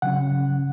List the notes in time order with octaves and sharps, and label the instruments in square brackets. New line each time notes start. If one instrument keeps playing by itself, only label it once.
[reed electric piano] C#3 F#3 C#4 F#5